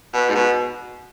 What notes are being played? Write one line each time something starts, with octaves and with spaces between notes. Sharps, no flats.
B2
G#2
B2